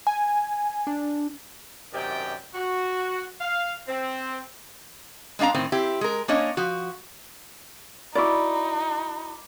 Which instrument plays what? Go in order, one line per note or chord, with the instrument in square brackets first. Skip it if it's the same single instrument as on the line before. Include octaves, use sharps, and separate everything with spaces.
[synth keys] G#5
D4
[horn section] F#2 C3 D#3 G4 D5 G5
F#4
F5
C4
[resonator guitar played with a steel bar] G#3 C4 D4 F5 A#5
A2 D#3 C4
C4 E4 G4
G#3 A#4
A#3 C#4 D4 C#5 D#5
F3 F#4
[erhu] D#4 [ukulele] E4 F#4 D5 [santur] B5 D6